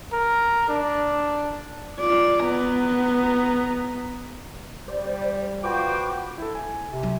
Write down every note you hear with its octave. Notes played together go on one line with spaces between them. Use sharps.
A#4
D4
F4 D5
B3 A#5
G3 C5 D5
F4 F#4 B4 C5 G5 D6
E4 A4
G#5
C3
F#3